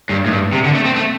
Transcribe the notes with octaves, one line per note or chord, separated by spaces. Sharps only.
G2
A2
G2
C3
D3
A3
C4
A3